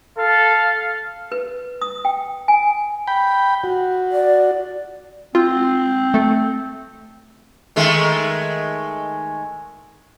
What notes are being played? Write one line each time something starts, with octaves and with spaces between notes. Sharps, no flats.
A4 F5
B4
D#6
G5
G#5
G5 B5
F#4
D5
C4 F4
A3 A4
D#3 G#3 A3